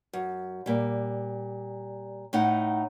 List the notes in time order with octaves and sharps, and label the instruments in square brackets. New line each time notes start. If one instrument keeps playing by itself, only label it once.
[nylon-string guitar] F#2
A#2 G3
A2 D#4 F#5